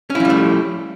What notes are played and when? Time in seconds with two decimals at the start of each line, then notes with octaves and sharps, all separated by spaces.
0.10 C#4
0.15 E4
0.20 F3
0.25 G3
0.30 A3